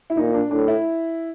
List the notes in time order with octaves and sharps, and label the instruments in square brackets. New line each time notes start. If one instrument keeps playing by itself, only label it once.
[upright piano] E4
[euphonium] A#2 [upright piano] D#4
[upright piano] D4
[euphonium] A2 [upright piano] D4
[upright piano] E4